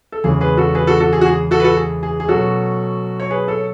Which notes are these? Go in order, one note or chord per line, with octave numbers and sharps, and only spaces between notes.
A4
E2 C#3 E3 G#3 C#4 G#4
G#4 B4
F#4 A4
G#4 B4
F#4 A4
F#4 A4
G#4
F#4
G#4
F#4 A4
B4
F#4 A4
G#4
G#4
G#4
B2 F#3 C#4 F#4 A4
C#5
G#4 B4
A4 C#5